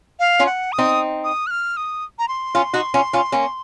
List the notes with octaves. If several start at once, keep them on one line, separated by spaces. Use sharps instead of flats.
F5
C#4 F4
F#5
D#6
C4 D#4
D#6
F#6
F6
D#6
A#5
C6
C#4 F4
D#4 F#4
C#4 F4
C#4 F4
A#3 C#4